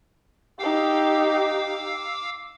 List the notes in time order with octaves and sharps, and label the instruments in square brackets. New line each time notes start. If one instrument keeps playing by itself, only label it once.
[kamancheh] D#4 G4 [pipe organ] F5 D6 E6